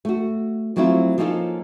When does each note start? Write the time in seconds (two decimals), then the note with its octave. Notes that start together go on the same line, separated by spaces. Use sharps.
0.05 A3 F#4
0.76 F3 F#3 A3 C4 E4 F4
1.18 F3 A#3 C#4 D#4 F4 A4